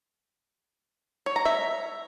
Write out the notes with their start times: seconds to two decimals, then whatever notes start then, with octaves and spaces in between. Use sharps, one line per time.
1.26 C#5
1.36 A#5
1.45 E5